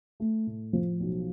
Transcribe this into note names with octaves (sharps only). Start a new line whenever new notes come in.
A3
A2
F3
B1